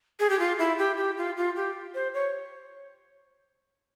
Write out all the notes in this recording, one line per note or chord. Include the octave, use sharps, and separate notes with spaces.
G#4
G4
F4
E4
G4
G4
F4
F4
G4
C5
C#5